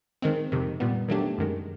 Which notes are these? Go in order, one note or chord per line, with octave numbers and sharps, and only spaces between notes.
D#3 G#3 C4
F2 C3 D#3
A#2 G3 B3
D#3 F#3 A3 D4 G4
F#2 D#3 G#3